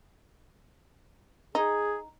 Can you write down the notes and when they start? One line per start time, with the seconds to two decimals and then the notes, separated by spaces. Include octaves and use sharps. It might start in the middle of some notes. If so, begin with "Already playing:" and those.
1.55 D#4 G#4